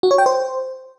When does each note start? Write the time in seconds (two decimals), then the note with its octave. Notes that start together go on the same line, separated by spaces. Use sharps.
0.03 F#4
0.11 C#5
0.18 G5
0.26 C5